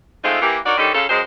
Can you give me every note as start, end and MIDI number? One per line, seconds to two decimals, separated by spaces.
0.24 0.40 53
0.24 0.40 56
0.24 0.40 57
0.24 0.40 60
0.24 0.40 63
0.24 0.40 65
0.42 0.58 52
0.42 0.58 58
0.42 0.58 67
0.66 0.75 63
0.66 0.75 66
0.66 0.75 70
0.66 0.75 73
0.66 0.75 74
0.78 0.91 50
0.78 0.91 51
0.78 0.91 55
0.78 0.91 61
0.78 0.91 63
0.78 0.91 69
0.94 1.04 49
0.94 1.04 65
0.94 1.04 69
1.09 1.21 42
1.09 1.21 56
1.09 1.21 72